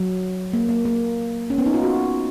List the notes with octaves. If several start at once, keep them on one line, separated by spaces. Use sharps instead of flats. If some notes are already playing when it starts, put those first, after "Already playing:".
Already playing: F#3
A#3
A#3
A#3
C#4
B3
D#4
F4
F#4